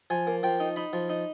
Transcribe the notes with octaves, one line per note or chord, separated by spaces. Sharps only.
F3 G#5
A#3
F3 G5
D#4
D#4 B5
F3
D#4